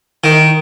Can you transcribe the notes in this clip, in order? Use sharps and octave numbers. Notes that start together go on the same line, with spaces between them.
D#3